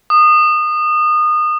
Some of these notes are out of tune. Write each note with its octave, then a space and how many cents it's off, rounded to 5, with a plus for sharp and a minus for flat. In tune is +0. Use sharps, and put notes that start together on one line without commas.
D#6 -25